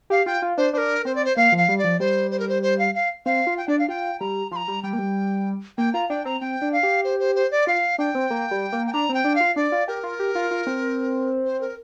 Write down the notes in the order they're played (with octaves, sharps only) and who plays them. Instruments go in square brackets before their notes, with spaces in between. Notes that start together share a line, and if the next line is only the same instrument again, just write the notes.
[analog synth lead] G4 [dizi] F5
[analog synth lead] F4 [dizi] G5
[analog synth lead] F4
[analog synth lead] D4 [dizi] C5
[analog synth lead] D4 [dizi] C5
[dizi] A#4
[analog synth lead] C4 [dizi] C5
[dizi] D5
C5
[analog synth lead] A#3 [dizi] F5
[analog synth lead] F3
[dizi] F5
[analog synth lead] G3
[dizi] D5
[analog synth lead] F3
[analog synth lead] G3 [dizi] C5
[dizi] C5
A#4
C5
C5
F5
F5
[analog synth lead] C4 [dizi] F5
[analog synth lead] F4
[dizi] G5
[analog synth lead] D4 [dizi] D5
[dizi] F5
[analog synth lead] F4 [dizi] G5
[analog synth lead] G3 [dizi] A#5
[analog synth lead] F3 [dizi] C6
[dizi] A#5
[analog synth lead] G3
[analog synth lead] G3 [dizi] G5
[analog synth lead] A#3
G3
[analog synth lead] A#3 [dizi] G5
[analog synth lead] F4 [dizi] A#5
[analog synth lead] D4 [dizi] G5
[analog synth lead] C4 [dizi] A#5
[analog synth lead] C4 [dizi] G5
[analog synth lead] D4
[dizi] F5
[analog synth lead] G4
[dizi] C5
C5
C5
D5
[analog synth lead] F4 [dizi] F5
[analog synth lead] D4 [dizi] G5
[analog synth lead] C4
A#3
G3
A#3
[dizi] G5
[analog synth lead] D4 [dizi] A#5
[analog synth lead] C4
[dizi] G5
[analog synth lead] D4
[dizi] F5
[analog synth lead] F4
[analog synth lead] D4 [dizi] D5
[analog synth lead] F4
[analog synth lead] G4 [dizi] A#4
[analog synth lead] F4
G4
F4
F4
C4
[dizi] C5
A#4